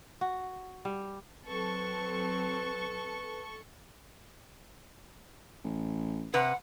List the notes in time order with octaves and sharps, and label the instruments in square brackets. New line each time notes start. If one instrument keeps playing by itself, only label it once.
[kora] F#4
G3
[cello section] F#3 C4 [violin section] A4 C#6 [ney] B4
[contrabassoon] A1
[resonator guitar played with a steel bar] C3 B4 [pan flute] F#5